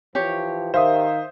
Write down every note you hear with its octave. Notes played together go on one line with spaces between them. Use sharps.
E3 F3 G4 C#5
D#3 C5 E5 F5 D#6